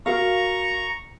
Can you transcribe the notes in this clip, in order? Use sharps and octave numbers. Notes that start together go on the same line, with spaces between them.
F#4 A#4 F5 A#5 C#6